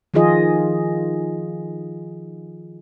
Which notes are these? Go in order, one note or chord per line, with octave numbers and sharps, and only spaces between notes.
D#3 F3 D#4 F4 G#4 D#5